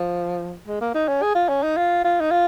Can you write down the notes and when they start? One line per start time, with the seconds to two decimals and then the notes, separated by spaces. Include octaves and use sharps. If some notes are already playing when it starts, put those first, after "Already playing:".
Already playing: F3
0.67 G#3
0.81 A#3
0.94 D#4
1.08 C#4
1.22 G#4
1.35 F4
1.49 C#4
1.63 D#4
1.77 F4
2.04 F4
2.21 D#4
2.31 F4